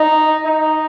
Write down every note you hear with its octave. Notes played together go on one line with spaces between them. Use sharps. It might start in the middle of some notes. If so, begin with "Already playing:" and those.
Already playing: D#4
D#4